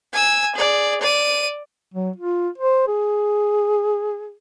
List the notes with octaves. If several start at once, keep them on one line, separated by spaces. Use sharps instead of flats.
G#5 E6
G#4 D5
D5 D#7
F#3
F4
C5
G#4